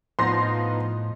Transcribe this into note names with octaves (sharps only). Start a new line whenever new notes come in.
A2 F3 B3 D#4 C6 A#6